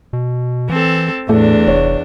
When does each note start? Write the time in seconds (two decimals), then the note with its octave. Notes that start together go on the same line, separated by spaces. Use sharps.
0.13 B2
0.69 E3 C4 A4
1.29 E2 A2 A3 D4
1.67 F1 C#5